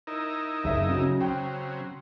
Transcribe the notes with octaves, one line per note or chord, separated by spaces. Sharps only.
D#4 E4 A#4
F#1 E5
C#3 F#3
C#3 F#3 C4 G5